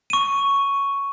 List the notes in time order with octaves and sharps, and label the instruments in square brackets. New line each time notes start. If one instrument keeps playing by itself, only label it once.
[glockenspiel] C#6 D#7